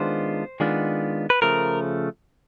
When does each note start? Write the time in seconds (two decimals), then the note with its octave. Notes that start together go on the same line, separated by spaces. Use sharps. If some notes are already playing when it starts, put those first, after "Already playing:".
Already playing: D#3 G#3 B3 D4 F4 C5
0.60 D#3 G#3 B3 D4 F4
1.30 B4
1.42 C#3 F3 A3 A#4